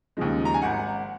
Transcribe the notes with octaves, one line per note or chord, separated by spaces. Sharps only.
D#2 C#3 F3 G#3
A#5
G#5
G#1 F#5